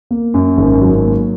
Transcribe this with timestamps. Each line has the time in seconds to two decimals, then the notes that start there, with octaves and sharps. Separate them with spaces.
0.11 A#3
0.34 F#2
0.57 G#1
0.81 F#3
1.05 A#3